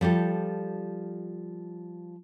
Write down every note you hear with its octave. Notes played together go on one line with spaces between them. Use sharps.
F3 G3 G4 A4